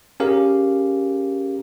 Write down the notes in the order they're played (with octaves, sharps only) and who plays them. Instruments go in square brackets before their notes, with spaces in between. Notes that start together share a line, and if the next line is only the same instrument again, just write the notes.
[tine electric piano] C#4 G4 G#4 A#4 F5